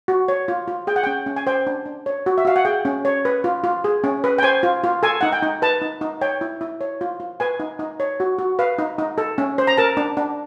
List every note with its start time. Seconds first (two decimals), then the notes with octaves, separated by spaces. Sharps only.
0.08 F#4
0.28 C#5
0.48 F4
0.68 F4
0.87 G#4 G5
0.96 F#5
1.04 C#4 G5
1.26 C#4
1.36 G#5
1.47 C5 G5
1.67 D4
1.86 D4
2.06 C#5
2.26 F#4
2.38 E5
2.45 F#4 F5
2.56 F#5
2.65 G#4 G5
2.85 C#4
3.05 C#5
3.25 B4
3.44 F4
3.64 F4
3.84 G#4
4.04 C#4
4.24 B4
4.38 G5
4.43 C5 G#5
4.63 F4
4.84 F4
5.03 A4 G#5
5.21 D#4 F#5
5.32 G5
5.43 D#4
5.62 B4 A5
5.82 D#4
6.01 D#4
6.21 C#5 G5
6.41 E4
6.61 E4
6.81 C#5
7.01 F4
7.20 F4
7.40 B4 G#5
7.60 D#4
7.79 D#4
8.00 C#5
8.20 F#4
8.39 F#4
8.59 B4 F5
8.79 D#4
8.98 D#4
9.18 A4
9.38 C#4
9.58 C5
9.67 A#5
9.77 A#4 A5
9.97 D4
10.17 D4